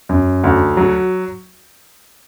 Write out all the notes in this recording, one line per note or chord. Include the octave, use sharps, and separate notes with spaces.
F#2
D2
F#3